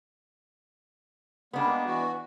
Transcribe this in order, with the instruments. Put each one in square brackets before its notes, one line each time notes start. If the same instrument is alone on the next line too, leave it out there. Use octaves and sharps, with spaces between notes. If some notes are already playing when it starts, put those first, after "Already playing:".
[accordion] G3 G#3 A#3 [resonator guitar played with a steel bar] B3 D4
[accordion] E3 F#4